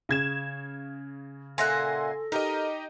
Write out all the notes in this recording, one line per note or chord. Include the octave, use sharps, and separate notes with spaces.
C#3 G#6 E7
A#2 A4 E5 F#5 G#5 C6 A#6
D#4 G4 A#4 D#5